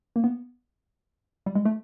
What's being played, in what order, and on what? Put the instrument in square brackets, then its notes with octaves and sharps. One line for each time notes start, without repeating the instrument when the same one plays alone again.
[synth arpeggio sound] A#3
B3
G3
G#3
A3